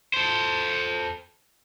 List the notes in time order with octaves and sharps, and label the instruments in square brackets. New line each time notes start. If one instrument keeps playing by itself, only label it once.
[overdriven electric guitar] A4 C5